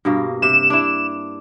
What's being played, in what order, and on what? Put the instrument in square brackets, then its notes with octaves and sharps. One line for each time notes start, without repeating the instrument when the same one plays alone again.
[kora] G2 B2 A#3
[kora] C3 [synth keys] E7
[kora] D4 E4